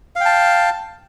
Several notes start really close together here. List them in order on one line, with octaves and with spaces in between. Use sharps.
F5 G5 A5